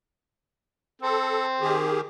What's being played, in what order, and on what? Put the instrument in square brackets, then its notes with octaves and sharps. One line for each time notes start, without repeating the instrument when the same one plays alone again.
[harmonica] C4 [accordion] A4
[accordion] D#3 G4 G#4